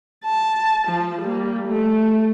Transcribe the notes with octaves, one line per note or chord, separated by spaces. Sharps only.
A5
F3
G3 A#3
A3